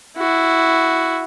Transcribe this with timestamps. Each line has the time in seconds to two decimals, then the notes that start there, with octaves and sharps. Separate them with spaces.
0.17 E4 F#4